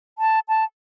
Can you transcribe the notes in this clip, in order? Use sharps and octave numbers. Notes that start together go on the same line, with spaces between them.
A5
A5